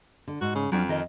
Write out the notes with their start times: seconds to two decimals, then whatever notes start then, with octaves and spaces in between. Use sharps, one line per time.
0.28 D3
0.41 G#2 F#4
0.55 C#3
0.72 F2 F#3 C#4 D4
0.89 D#3 A#4 D#5